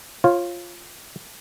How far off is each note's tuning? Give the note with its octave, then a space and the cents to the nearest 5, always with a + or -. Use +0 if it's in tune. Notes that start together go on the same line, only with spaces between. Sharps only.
F4 +0 C#5 -35